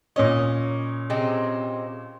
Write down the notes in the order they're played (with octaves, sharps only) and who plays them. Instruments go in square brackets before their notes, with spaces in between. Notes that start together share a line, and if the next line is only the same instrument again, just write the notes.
[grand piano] A#2 C#4 C#5 [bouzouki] D#5
[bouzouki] C3 G#3 C4